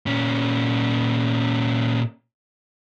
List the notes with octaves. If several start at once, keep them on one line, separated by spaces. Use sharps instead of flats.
A#2 C#4